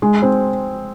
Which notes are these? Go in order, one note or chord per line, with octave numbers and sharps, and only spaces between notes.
G#3
C4